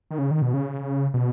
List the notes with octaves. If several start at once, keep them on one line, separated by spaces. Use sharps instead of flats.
D#3
C#3
D#3
B2
C#3
B2